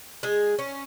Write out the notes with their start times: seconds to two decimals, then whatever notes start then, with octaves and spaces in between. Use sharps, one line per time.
0.23 G#3 G#4
0.59 C#4